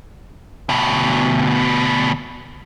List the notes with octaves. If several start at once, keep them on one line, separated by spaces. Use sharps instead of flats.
D2 B2